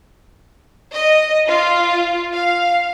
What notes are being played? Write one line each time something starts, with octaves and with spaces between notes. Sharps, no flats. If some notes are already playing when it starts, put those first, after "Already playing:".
D#5
F4
F5